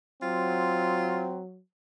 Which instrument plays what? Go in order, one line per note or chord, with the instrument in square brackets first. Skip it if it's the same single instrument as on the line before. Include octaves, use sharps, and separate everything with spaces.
[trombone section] F#3 [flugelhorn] C4 [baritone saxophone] F4